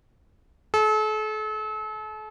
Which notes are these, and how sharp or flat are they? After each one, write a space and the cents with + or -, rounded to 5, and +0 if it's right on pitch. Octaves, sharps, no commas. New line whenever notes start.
A4 -40